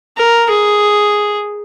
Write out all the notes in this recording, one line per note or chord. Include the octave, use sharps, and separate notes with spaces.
A#4
G#4